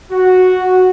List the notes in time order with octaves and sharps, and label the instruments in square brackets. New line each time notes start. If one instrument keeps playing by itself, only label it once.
[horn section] F#4